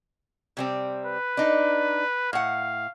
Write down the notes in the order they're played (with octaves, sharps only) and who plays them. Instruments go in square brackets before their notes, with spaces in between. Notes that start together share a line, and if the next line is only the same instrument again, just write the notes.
[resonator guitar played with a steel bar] C3 G3 C4
[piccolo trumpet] B4
[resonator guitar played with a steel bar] D4 D#4
[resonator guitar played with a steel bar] A2 F#5 [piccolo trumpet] F5